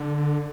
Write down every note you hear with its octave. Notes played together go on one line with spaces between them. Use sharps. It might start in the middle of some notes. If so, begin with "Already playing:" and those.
Already playing: D3